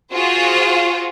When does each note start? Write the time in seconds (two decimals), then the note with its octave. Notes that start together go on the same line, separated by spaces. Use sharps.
0.13 F4 F#4 G#4 C5